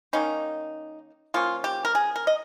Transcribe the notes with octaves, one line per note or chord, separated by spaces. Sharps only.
D#3 A#3 C#4 D#4
F3 A#3 C#4 F4
G4
A#4
G#4
A#4
D#5